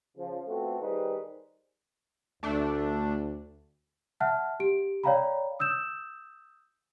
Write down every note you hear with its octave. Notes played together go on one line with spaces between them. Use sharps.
C#3 F3
A3 B3 C4 F4 F#4 A4
D#3 G3 D#4 G#4 B4 C5
D2 A3 D4
E5 F#5 A5 F6 F#6
G4 D7
C#5 D5 F5 G5 A#5 B5
D#6 E6 G6 E7